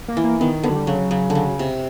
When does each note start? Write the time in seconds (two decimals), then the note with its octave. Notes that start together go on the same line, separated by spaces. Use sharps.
0.08 A#3
0.17 E3
0.24 A#3
0.40 D#3 B3
0.63 D3 B3
0.70 F#3
0.76 G3
0.87 C#3 F#3
1.11 C#3
1.30 D3
1.35 C#3
1.59 C3